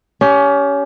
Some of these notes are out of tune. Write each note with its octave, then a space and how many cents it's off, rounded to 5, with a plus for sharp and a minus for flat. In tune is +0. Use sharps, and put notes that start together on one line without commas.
C#4 +25 G4 +0